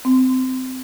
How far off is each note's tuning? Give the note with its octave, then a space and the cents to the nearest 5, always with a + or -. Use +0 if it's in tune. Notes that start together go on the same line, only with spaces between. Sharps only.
C4 -20